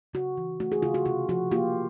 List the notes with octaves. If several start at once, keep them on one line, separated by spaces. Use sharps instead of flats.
C#3 F#4
E3
A3 F#4
F#4 G#4
C#3 F4
F#4
C3 F4
F3 F#4
A#3 F4 G4